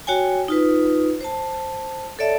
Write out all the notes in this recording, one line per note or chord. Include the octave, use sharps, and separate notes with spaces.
F#4 C#5 G5 G#5
D#4 F4 B4
C5 A5
A4 C#5 D5 E5 A5